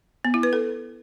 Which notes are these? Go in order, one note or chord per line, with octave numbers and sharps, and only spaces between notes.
B3
E4
B4
A4